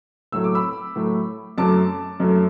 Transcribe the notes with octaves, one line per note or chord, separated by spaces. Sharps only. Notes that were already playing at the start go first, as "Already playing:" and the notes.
A2 F#3 A3 E6
D6
B5 E6
A2 F#3 A3
F#2 F#3 A3 A5 D6
F#2 F#3 A3